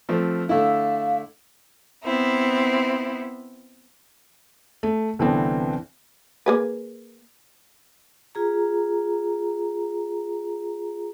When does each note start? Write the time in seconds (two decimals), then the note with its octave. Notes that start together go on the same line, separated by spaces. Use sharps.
0.09 F3 A3 C4
0.49 D3 A3 E4 F5
2.03 B3 C4 E4
4.83 A3
5.19 C2 D3 E3 B3 C4
6.46 A#3 G#4 B4
8.35 F4 G#4 A#5